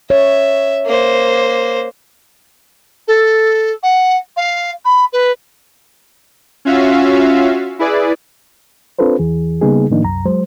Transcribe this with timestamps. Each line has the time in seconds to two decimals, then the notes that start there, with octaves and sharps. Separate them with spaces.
0.10 C#5 E5
0.86 A#3 C5
3.08 A4
3.83 F#5
4.37 F5
4.85 B5
5.13 B4
6.65 C#4 F4 F#4 E5 F5
7.79 E4 G#4 B4 D5
8.99 C4 D4 F4 A4 B4 C5
9.19 E2 E3 G#4
9.61 C#3 G3 A#3 B3 D#4 G#4
9.90 A2 D#3 F3 A#3 D4 D#4
10.03 C2 F#2 A#5
10.25 F#3 G#3 C5